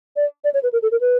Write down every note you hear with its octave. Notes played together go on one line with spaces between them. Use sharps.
D5
D5
C#5
B4
A#4
A4
A#4
B4